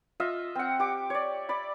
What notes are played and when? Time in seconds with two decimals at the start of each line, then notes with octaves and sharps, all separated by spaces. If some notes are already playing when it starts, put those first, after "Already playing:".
0.20 F4 D#5 E5
0.55 C4 F#5
0.80 G4 D6
1.10 C#5 D5
1.49 D5 B5